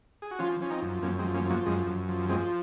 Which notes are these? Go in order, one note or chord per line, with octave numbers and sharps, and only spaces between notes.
G#4
F#4
F3 C#4 F4
F3 C#4
C4 D#4
F#2
F#2 A#3 C#4
G#3 C4
F3
A#3 C#4
F3
F#3 A#3
F#2 G#3
F#2
F3
F3 G#3 C4